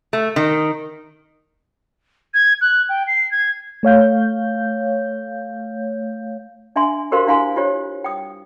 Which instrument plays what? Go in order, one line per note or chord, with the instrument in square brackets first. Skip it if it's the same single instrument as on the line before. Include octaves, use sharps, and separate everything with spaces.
[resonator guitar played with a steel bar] A3
D#3
[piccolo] G#6
F#6
G5
C7
G#6
[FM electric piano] A3 C#5 F5 G6
[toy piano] D4 E5 G#5 C6
F#4 G4 A#4 C5 F5 C6
D4 E4 F5 G#5 C6
F4 G4 C5 C#5
G5 D#6